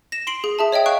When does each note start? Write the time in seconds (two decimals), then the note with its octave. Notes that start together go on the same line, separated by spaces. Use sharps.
0.12 A#6 E7
0.27 C6 C7 D7 F#7
0.44 G#4
0.59 G#4 E5 A5
0.72 C#5 D#5 E5 G5 D#6
0.86 F5 C#6 F#6 D7